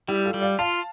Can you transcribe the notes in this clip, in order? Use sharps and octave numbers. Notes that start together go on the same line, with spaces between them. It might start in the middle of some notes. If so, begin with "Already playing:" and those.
G3 E4 G4
F4 A4
G3
D5 F5
F4 F5 A5